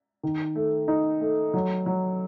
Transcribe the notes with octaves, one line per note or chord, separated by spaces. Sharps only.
D#3
A3
D#4
A3
F#3
F#3